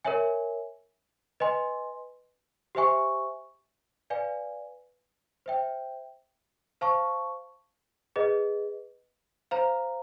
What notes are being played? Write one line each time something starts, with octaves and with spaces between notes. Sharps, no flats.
A#4 C#5 E5 G#5
B4 D#5 G#5 C6
G4 C5 E5 G#5 C#6
B4 D5 F5 G#5
C5 E5 G5
C5 F5 A5 C#6
G#4 B4 D#5
C5 F5 A#5